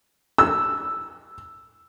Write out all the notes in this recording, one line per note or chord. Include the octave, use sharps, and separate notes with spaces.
E6